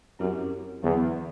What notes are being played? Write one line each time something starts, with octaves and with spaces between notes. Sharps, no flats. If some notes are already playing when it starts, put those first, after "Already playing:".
F#2 C4 E4 G4
E2 D3 F#3 B3